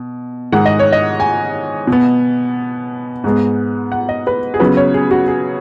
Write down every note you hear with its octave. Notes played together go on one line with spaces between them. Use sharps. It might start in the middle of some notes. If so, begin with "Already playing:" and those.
Already playing: B2
G#2 D#3 G#3 F#5
D#5
C#5
D#5
G#5
B2 B3
G#2 G#3 B3
F#5
D#5
B4
G#4
C#3 F#3 B3 B4
C#5
G#4
F#4
G#4